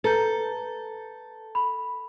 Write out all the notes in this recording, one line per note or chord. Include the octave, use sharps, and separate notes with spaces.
A4 B4 A#5 G6
B5